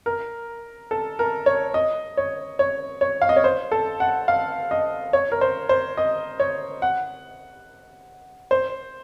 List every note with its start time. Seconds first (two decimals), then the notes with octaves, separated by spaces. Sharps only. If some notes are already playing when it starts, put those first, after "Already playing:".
0.06 A#4
0.91 A4
1.19 A#4
1.46 C#5
1.74 D#5
2.17 C#5
2.59 C#5
3.01 C#5
3.22 F5
3.29 D#5
3.36 C#5
3.44 C5
3.72 A4
4.00 F#5
4.28 F5
4.71 D#5
5.13 C#5
5.32 A#4
5.41 C5
5.69 C5
5.97 D#5
6.40 C#5
6.82 F#5
8.51 C5